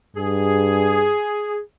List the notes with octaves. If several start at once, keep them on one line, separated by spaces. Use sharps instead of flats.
G2 G#4